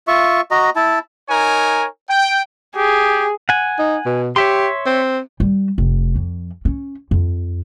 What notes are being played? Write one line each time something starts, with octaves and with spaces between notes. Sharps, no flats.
F4 E5 C#6
F#4 D#5 A#5
E4 A5
D#4 A#4 C#5 G#5
G5
G4 G#4
F#5 G#5
D#4
B2
G4 C#5 E5 C6
C4
G3
F1
F2
C#4
F2